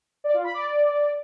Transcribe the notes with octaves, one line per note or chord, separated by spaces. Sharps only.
D5
F4
B5
D5